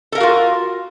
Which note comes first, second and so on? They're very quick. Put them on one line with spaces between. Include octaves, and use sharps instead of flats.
A4 A#4 F5 F#4 F4